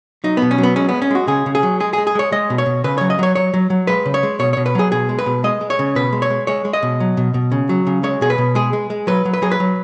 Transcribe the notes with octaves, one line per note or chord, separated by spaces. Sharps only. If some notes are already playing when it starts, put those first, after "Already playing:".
F#3 D#4
B2 B3
C#4
F#3
B3
G#3 C#4
G#3 B3
C#4
G#3 F#4
C#3 G#4
C#3
G#4
F#3
G#3 G#4
G#4
G#3
G#4
G#3 C#5
G#3 D#5
B2
C#5
B2
C#3 B4
F#3 C#5
D#5
F#3 C#5
F#3 C#5
F#3
F#3
G#3 B4
C#3
C#5
G#3
B2 C#5
B2 C#5
B4
F#3 G#4
B2 G#4
G#3
B4
B2
G#3 D#5
G#3
C#5
C#3
B2 B4
G#3
C#5
G#3
G#3 C#5
G#3
D#5
B2
F#3
B2
B2
C#3
F#3
C#3
G#3 C#5
B2 G#4
B4
B2
G#3 G#4
G#3
G#3
F#3 B4
F#3
B4
F#3 G#4
B4
F#3